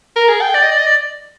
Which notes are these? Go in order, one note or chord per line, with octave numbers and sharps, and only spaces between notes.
A#4
G#4
G5
D5
D#5
D5
D#5
D5